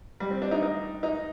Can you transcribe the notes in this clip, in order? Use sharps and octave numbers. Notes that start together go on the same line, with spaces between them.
G3
C4
D4
D#4
D#4
D#4